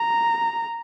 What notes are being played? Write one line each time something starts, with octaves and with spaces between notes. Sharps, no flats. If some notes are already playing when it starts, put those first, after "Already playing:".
Already playing: A#5